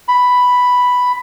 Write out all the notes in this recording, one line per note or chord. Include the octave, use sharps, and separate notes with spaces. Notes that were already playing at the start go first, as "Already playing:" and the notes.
B5